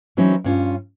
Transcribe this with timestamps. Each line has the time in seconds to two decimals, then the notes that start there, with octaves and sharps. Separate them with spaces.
0.17 E3 F#3 C4 C#4 D#4 E4
0.44 G2 C#4 F4